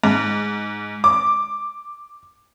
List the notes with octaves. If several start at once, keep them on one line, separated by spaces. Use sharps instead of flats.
G#2
D6